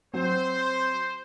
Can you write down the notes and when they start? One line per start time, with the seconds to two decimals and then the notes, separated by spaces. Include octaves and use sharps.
0.14 F#3 C4 C5